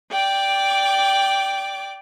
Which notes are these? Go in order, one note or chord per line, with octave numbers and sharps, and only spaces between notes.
D5 G5 D6